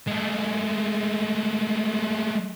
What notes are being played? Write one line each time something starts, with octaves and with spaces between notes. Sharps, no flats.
G#3 A3